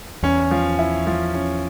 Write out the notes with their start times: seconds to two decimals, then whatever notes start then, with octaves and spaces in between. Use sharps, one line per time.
0.23 E2 C#4
0.51 F3
0.79 E4
1.07 F3
1.35 C#4